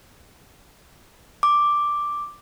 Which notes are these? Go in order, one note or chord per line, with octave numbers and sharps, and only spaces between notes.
D6